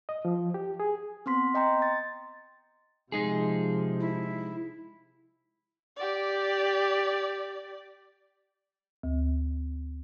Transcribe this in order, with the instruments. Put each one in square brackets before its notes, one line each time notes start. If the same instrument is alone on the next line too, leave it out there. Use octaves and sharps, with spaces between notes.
[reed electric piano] D#5
F3
G4
G#4
[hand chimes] B3 C4 C6 B6
D#5 G5 A#5 C6
A6
[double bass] C3 F3 [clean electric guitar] G#3 D#4 G#4
[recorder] E4
[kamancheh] G4 D5
[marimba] D2